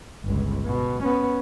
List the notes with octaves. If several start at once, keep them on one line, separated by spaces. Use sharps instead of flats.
G1 C#2
B2
B3 C#4